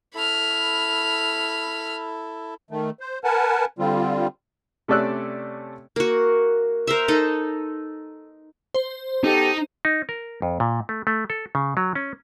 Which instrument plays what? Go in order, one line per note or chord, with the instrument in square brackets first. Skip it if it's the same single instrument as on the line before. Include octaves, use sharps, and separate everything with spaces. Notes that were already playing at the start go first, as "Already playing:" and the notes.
[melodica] E4 A4 [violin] B5 F6
[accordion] D#3 A3
C5
A#4 B4 F#5 G#5 A5
D3 G3 C4 F4
[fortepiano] C3 A3 C#4 D5 E6 F#6
[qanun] A#3 F#4
A#4 C5 E5
D#4 A4 D#5
[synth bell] C5
[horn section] B3 G4 A4 [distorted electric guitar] D#4
[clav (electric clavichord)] D#4
A#4
F2
A#2
A3
A3
A4
C#3
F#3
C#4